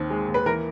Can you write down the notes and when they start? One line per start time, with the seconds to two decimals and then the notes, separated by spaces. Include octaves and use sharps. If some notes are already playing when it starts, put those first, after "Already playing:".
Already playing: D#2 D#3 C4
0.10 G#3
0.28 D#2
0.34 B4
0.46 E3 A#4